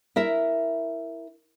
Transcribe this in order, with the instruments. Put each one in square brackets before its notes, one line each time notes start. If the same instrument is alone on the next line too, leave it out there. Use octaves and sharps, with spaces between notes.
[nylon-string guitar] E4 A#4 E5